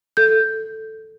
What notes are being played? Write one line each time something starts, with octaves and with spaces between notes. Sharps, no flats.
A4 G6